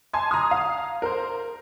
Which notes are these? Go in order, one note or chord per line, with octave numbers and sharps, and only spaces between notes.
G#5 A5 C6 G#6
A#5 C6 D#6
F5
A#4 C5